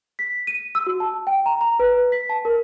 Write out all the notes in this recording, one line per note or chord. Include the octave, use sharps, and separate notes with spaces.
B6
D#7
E6
F#4
A5
G5
A#5
A#5
B4
B6
A5
A#4